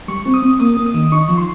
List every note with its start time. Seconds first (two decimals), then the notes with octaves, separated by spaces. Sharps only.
0.08 G3 C#6
0.26 C4
0.34 D#6
0.42 C4
0.60 A#3 D#6
0.77 A#3
0.86 D#6
0.94 D#3
1.12 D#4 C#6
1.28 F3
1.37 C6